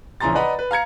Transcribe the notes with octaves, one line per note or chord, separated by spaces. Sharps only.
A#1 C#3 E3 A#5 C6 A6
B4 D5 D#5 F#5 A#5 B5
B4
F5 A#5 G#6 C#7